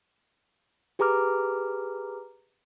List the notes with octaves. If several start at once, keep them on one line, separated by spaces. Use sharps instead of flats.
G4 G#4 B4 A#5 D6 F6